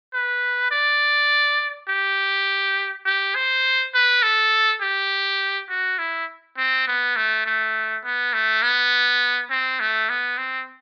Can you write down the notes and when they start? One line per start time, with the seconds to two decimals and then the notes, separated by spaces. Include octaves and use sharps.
0.13 B4
0.71 D5
1.89 G4
3.05 G4
3.35 C5
3.94 B4
4.22 A4
4.81 G4
5.69 F#4
5.99 E4
6.57 C4
6.87 B3
7.16 A3
7.46 A3
8.04 B3
8.33 A3
8.62 B3
9.50 C4
9.80 A3
10.10 B3
10.38 C4